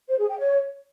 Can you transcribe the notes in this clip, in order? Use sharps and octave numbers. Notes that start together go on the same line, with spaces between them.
C5
G#4
G5
C#5